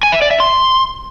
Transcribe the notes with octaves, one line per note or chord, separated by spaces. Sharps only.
G#5
E5
D5
E5
C6